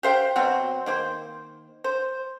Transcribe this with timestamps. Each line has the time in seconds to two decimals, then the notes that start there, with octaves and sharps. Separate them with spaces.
0.03 G4 C5 F5 G5
0.36 B2 F#3 C4
0.86 D#3 A#3 C5
1.84 C5